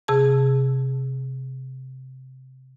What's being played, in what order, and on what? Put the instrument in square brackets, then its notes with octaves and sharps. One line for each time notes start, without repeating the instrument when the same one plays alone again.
[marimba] C3 G#4 A5